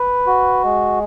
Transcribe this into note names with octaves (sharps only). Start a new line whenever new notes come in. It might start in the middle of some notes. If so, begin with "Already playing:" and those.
Already playing: B4
F#4
G#3